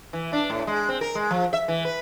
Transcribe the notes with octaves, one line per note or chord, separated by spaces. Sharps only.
E3
D4
A2
G#3
C4
A#4
G#3
F3
E5
E3
B4